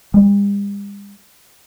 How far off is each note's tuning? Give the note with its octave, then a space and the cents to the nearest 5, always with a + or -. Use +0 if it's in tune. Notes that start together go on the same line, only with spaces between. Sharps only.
G3 +45